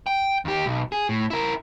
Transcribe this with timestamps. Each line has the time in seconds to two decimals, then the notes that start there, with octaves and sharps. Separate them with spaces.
0.07 G5
0.45 D#2 G4
0.66 B1
0.92 G#4
1.09 A2
1.30 E4 A#4